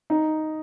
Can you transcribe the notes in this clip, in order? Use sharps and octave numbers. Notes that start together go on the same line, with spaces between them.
D#4